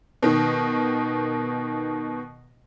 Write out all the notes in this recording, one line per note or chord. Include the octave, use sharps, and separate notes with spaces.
B2 D#3